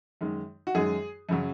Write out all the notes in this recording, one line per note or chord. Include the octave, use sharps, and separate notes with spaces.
F#2 D#3 G#3
F#4
F#2 D#3 G#3 G#4
F#2 C#3 F#3